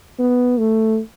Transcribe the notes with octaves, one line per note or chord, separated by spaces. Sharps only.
B3
A3